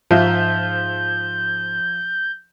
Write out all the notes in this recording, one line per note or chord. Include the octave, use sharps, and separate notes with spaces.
G#2 F3 F4 E5 G6